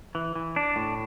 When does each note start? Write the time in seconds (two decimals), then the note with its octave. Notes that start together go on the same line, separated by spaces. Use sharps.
0.15 E3
0.35 E3
0.56 D4
0.76 A2